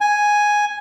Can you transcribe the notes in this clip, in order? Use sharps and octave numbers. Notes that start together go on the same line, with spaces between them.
G#5